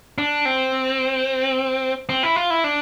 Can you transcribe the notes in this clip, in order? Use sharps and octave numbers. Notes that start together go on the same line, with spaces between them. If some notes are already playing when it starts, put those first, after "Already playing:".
D4
C4
C4
E4
F4
E4
D4